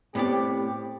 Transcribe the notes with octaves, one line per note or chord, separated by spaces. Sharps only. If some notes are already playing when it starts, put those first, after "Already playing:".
A2 B3 C4 G4 D5